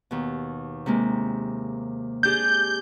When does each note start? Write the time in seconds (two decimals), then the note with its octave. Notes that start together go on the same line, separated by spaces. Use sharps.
0.11 D#2 B2
0.86 C3 G#3 A#3
2.23 D4 G4 G#4 G6